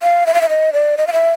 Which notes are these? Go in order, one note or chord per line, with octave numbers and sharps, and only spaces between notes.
F5
E5
F5
E5
D#5
D5
D#5
F5
E5